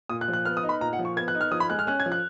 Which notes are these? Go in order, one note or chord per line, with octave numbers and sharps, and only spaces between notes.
A#2 D#6
F#6
F3
F#6
B3 F6
D#6
D#4
B5
A#2 A#5
F#5
F3
C#6
B3 G#6
F#6
D#4
F6
F3 D#6
B5
G#3 F#6
F6
C#4 F#6
G#6
F3
F#6